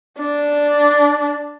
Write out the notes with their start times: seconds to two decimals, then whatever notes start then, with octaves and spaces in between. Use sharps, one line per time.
0.20 D4